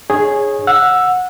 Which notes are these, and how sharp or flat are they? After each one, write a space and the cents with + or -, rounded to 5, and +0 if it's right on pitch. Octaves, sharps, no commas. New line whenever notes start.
D#4 -40 G#4 +0 C#5 -15
F#5 -20 E6 +5